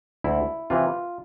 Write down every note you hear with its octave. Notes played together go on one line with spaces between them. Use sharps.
D2 E4
C3 E3 F4